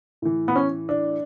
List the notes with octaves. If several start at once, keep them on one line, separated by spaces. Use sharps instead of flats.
A2 E3
B3
C#4
D4